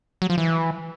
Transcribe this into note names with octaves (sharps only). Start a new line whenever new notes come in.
F#3
F3
E3